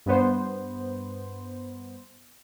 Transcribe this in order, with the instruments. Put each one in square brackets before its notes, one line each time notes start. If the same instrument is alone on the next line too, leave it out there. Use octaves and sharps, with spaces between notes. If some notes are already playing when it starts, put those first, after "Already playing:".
[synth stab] G2 B3 C5